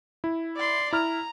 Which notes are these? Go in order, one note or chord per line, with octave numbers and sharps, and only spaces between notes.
E4
D5 C6
E4 A#5 F6